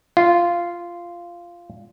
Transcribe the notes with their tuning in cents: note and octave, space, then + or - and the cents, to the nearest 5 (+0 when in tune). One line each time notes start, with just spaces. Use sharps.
F4 -10